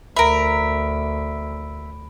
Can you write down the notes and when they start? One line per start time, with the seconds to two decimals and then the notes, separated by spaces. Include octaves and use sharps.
0.16 D2 A#4 E5 B5 D7